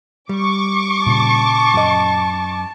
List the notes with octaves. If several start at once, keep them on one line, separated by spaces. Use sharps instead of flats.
G3 C#6 D6
A#2 C#3 A5
F#2 D#5